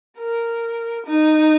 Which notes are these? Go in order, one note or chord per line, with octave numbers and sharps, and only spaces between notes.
A#4
D#4